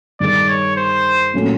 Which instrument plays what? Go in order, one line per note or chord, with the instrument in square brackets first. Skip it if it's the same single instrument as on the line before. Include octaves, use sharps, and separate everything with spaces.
[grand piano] G2 D#3 G#3 [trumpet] D5
[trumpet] C#5
C5
[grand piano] A#2 F#3 A3 C#4